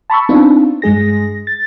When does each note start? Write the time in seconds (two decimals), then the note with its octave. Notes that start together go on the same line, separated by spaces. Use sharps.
0.10 A5 B5 C#6 E6
0.29 B3 C4 D4 D#4 F4
0.82 G2 G#3 G#4 A#6
1.47 A6